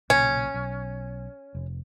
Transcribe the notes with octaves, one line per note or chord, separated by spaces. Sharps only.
B1 A#2 C#3 C#4
B1
F1